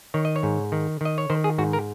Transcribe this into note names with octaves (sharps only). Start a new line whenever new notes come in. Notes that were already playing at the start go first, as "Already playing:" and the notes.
D#3 C#5
D#5
C#5
G#2
D#3
D#3 D#5
C#5
D#3 C5
G#4
G#2 F#4
A#4